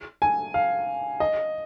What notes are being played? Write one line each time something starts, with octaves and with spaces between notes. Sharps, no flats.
G#5
F5
D#5